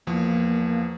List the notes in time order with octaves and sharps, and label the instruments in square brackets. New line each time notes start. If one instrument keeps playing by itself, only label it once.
[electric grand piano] E2 F3 [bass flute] A#3